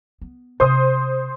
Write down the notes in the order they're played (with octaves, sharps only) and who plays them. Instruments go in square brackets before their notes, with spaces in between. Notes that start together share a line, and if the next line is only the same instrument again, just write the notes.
[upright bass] B3
[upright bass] C3 [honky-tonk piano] C5 C6 D#6